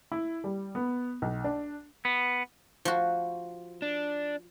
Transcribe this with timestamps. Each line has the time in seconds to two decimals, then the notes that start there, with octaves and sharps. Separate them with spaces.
0.12 E4
0.44 G3
0.75 B3
1.22 B1
1.44 D4
2.05 B3
2.85 F3 F#4
3.82 D4